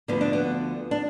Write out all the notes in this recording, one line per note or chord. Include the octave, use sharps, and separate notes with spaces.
D2 D3 F3 B3
D4
B3
D4